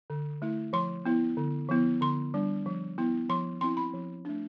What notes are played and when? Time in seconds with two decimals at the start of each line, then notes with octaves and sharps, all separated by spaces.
0.10 D3
0.42 A3 E4
0.73 F3 C6
1.06 B3 E4
1.37 D3
1.69 F3 B3 E4
2.01 D3 C6
2.34 G3 D4
2.66 F3
2.98 B3 E4
3.29 F3 C6
3.61 C4 E4 C6
3.77 B5
3.94 F3
4.25 A3 D4